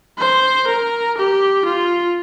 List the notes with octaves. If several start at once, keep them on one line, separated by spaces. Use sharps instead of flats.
C5
A#4
G4
F4